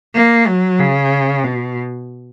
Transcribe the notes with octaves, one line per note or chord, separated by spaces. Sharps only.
A#3
F#3
C#3
B2